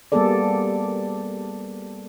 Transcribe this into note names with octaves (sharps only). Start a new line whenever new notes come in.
G3 A#3 B3 G#4 A4 D5